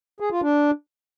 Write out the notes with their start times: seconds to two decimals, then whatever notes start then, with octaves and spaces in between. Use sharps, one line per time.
0.20 G#4
0.31 F4
0.42 D4